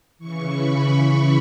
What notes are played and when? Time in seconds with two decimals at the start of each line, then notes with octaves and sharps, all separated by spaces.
0.19 C#3 E3 C#6
0.54 B5
0.88 C#6